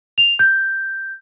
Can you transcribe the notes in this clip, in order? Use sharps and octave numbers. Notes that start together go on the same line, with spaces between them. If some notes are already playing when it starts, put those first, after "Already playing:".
F7
G6